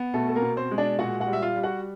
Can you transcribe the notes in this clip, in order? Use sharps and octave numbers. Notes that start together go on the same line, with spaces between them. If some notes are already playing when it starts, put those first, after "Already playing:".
Already playing: B3
B2 A3 A4
A4
A#3 A#4
B2
C4 C5
G#3
D4 D5
A#2 F#4 F#5
F#4 F#5
G3
E5
F4 F5
G3
F#4 F#5